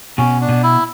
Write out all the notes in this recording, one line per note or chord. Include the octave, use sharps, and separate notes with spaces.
B2 C#4
D4
B2
E4